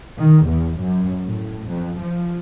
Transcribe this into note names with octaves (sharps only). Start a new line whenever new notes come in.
D#3
E2
F#2
A2
F2
F3